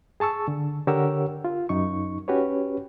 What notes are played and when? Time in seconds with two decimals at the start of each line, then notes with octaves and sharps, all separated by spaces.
0.20 G#4 A5 C#6 E6
0.48 D3
0.87 D3 G4 A#4 C#5 F#5 E6
1.45 F4
1.69 F#2 D#4 C#6
2.28 C#4 F#4 G4 B4 C#5